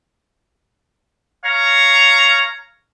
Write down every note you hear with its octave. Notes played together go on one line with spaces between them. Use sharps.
C#5 F5 A#5